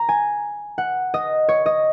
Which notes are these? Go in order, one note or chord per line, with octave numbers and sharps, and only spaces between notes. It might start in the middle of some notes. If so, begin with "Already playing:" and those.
Already playing: A#5
G#5
F#5
D#5
C#5
D#5